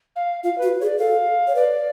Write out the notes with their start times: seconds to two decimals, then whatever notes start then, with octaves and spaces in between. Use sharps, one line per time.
0.16 F5
0.43 F4 F5
0.58 F#4 B4
0.80 G#4 C#5
0.85 D5
0.99 A4 F5
1.47 C#5
1.55 B4 D5